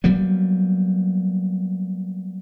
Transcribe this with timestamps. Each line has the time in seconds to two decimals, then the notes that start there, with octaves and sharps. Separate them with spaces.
0.04 F#3 G3 A#3 B3